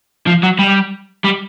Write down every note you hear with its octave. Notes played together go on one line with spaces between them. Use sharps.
F3
F#3
G3
G3